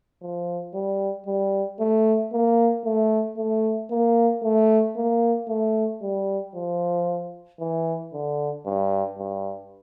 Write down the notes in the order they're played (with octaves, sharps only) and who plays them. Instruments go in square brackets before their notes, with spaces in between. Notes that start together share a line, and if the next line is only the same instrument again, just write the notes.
[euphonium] F3
G3
G3
A3
A#3
A3
A3
A#3
A3
A#3
A3
G3
F3
E3
D3
G2
G2